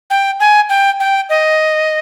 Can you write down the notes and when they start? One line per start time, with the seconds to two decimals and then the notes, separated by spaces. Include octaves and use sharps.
0.10 G5
0.40 G#5
0.69 G5
1.00 G5
1.30 D#5